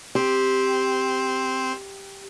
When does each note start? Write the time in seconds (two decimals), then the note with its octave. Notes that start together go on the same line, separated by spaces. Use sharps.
0.15 C4 G4 C5